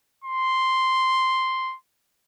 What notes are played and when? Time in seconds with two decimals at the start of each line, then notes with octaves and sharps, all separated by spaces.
0.24 C6